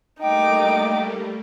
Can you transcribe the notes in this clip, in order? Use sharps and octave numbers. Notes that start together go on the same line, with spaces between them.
G3 A3 A#3 D#4 G5 D6